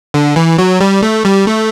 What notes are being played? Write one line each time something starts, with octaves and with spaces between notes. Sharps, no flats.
D3
E3
F#3
G3
A3
G3
A3